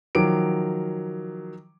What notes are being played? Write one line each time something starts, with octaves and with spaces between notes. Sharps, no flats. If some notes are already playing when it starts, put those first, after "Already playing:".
D#3 F3 F#3 D6 D7